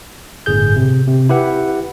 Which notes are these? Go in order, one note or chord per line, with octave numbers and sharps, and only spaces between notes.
G1 A2 G#4 G6
C3
C3
E4 G4 B4 F#5